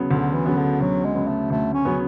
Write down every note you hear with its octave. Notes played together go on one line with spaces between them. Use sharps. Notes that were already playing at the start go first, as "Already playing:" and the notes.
Already playing: D2 C#3 F#3 B3
D2 D3
E3
C#3 F#3 B3
D3
D2 F#3
G#3
C#3 F#3 B3
A3
D2 A3
C#4
C#3 F#3 B3